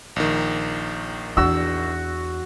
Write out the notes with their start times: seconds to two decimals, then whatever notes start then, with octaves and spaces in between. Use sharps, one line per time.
0.16 A#1 D#3
1.37 E2 D4 F#4 E6